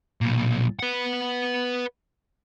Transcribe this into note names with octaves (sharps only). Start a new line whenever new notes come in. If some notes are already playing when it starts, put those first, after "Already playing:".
B1 A#2
B4 F#5